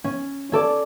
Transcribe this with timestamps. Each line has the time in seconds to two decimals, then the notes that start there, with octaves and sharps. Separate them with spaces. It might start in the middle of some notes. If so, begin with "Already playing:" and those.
0.04 C#4
0.52 C#4 A4 D5